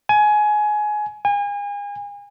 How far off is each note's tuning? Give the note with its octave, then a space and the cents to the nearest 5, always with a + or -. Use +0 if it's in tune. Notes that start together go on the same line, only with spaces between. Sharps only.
G#5 +20
G#5 -35